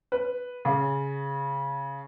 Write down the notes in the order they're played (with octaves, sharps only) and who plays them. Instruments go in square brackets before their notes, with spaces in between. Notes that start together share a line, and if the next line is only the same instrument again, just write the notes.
[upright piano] B4
C#3